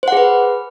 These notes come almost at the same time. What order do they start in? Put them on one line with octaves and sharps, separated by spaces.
C5 F#5 G#4 B4